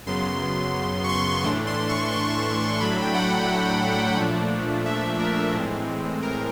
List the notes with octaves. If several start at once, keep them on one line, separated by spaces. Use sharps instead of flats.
F#2 C#3 F#3 B3 C6
C#6
C6
A2 E3 A3 D4 C6
C6
C#6
C6
A2 F#3 A3 D4 B5
G5
F#5
A#2 F3 A3 D4
E5
A#4
A2 E3 G#3 C4
A#4